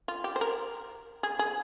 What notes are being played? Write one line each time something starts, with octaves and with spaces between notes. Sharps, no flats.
F4
G4
C5
A#4
G#4
G#4